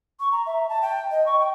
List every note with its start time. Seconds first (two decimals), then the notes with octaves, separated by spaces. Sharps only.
0.20 C#6
0.32 A#5
0.46 E5
0.69 A5
0.82 G5
1.11 D#5
1.26 C#6
1.39 G5